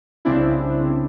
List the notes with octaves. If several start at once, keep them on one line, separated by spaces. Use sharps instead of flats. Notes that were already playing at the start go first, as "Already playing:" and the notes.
C2 C#3 C4 D4 E4